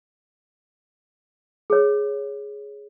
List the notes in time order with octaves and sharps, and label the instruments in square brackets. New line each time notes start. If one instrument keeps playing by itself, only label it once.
[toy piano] G#4 C#5